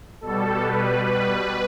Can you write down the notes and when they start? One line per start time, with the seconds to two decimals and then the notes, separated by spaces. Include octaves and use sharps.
0.21 B2 G3 A4
0.63 B4
1.04 B4